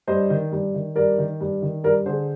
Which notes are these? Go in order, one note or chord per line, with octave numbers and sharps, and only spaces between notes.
G2 C5 D#5
D#3
G2
D#3
G2 A#4 D5
D#3
G2
D#3
G2 A#4 D5
D3 G#4 C5